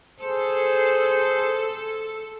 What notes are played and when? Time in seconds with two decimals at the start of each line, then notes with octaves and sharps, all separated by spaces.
0.19 G#4 A4 C5